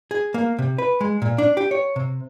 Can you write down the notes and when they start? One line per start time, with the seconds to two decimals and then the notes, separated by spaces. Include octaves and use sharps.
0.11 G#4
0.34 A#3
0.59 C3
0.78 B4
1.01 G#3
1.22 A#2
1.38 D4
1.57 G4
1.71 C#5
1.96 C3